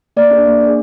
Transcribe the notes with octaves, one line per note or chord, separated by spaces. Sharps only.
A#3 D5
D4 G#4
A#3
D4 G#4